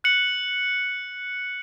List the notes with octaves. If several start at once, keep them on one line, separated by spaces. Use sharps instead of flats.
F#6 C#7 F#7